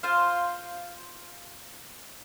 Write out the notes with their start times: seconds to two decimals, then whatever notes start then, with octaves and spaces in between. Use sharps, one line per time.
0.03 F4 C5 F5